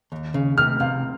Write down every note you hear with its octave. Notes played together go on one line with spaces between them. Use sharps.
D#2
C#3
C3 F6
C3 F5